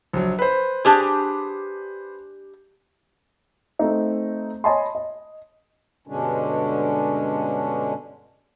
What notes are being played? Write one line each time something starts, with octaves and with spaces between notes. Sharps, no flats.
A#1 F#3
B4 C5
D4 G4 G#4
A3 C4 D#4
C#5 D#5 G#5 A5 B5 C6
D#5
G2 B2 D3 G#3 C#4 D4